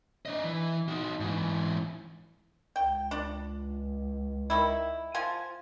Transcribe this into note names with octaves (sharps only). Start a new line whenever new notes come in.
D4 D#5
E3
D#4 F#4
G#2 E3
C#2 G5
D4
D#3 E4
F3 F4 G#5